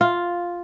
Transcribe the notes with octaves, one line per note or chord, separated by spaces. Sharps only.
F4